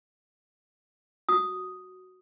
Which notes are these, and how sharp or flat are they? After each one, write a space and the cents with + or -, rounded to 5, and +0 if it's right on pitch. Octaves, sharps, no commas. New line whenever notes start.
F#4 +0 D#6 +0